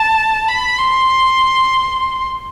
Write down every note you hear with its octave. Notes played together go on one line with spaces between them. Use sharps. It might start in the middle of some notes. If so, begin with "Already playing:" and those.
Already playing: A5
B5
C6